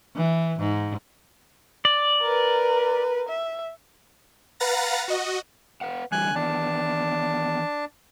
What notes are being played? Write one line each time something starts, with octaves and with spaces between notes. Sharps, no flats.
E3
G#2
D5
A#4 B4
E5
B4 F5 F#5 A#5 A6 A#6
F#4 D#5
B4 F5 F#5
D3 E3 G3 G#5 F#6
D#3 E3 B3 D4 A5